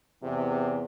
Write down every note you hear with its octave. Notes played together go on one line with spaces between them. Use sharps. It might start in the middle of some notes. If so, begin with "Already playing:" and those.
E2 C3